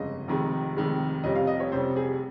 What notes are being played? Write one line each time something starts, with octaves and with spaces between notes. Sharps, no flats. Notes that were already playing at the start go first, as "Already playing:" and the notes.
Already playing: G1 F2 C#3 G#3 D#5
F1 F2 D#3 G#3
F1 F2 D#3 G#3
F1 F2 C3 G3 C#4 D#5
F5
D#5
C#5
F1 F2 C3 G3 C#4 C5
G#4